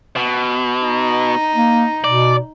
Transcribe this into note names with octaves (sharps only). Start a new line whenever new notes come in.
B2
D#4
A#3
B2 D5